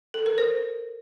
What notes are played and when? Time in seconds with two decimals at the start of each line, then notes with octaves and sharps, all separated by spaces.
0.14 A4
0.26 A#4
0.38 C5